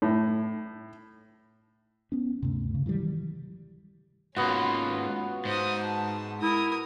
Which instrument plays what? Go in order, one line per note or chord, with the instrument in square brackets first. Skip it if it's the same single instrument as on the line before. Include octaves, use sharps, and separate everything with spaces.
[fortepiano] A2
[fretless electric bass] B3 C#4
D2 G2 C3
C#3
D#3 E3 F#3 G3
[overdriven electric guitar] G#2 A#3 [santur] B3 F#4 [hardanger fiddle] C#4 F4
[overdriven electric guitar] G#2 [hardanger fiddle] C5 D#6
[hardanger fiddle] A5
[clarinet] E4 [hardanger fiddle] A#4 D#6